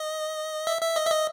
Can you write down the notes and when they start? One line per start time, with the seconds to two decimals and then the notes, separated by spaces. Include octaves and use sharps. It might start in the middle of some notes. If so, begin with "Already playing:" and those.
Already playing: D#5
0.67 E5
0.82 E5
0.96 D#5
1.06 E5
1.11 D#5